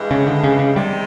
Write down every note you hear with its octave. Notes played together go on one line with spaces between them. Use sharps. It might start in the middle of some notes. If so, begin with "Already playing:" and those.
Already playing: G2 E3 G#3
C#3
D3
C#3
C#3
E2 C3 D#3 G3